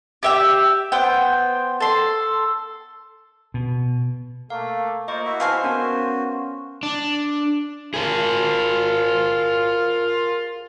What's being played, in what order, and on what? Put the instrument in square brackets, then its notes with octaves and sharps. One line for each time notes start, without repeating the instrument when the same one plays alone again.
[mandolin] G4 E5 G5
B3 C5 G5
A4 C6
[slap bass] B2
[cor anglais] A3 [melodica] A#3 [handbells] F5
[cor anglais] A#3 [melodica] F4 C5 [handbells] D#5 C#6
[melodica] E4 F#4 E5
[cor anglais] C5 [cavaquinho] F5 G#5 C6
[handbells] B3 C#4 A#4 [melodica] F#4
[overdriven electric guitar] D4
[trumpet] F4 [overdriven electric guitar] G#4 A#4